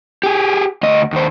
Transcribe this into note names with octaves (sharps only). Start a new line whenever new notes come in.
G4 G#4
D2 D#5
D#2 C5